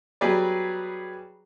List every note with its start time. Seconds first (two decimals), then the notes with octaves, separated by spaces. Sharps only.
0.21 F#3 G3 B3 G#4 B4 D5